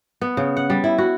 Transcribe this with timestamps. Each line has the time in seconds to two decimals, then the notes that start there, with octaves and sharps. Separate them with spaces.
0.21 B3
0.37 C#3
0.57 F#5
0.70 G3
0.84 E4
0.98 F#4